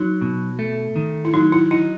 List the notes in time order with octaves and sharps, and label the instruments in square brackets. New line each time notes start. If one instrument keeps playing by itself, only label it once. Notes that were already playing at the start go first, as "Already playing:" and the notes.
Already playing: [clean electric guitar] F#3 [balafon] D#4
[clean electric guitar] B2
A3
D#3
[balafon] E4
[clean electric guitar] F#3 [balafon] D#4
[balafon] E4
[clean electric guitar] D#4 [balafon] E4